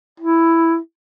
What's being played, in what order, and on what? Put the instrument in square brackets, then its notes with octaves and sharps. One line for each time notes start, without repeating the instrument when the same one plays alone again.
[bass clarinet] E4